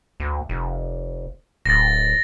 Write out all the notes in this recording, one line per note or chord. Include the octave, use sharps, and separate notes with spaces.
D2
F1
D1 A6 A#6